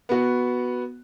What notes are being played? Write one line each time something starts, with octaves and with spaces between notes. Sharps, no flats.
B3 F#4